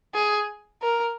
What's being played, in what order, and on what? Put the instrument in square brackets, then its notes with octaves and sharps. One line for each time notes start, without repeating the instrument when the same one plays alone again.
[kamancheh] G#4
A#4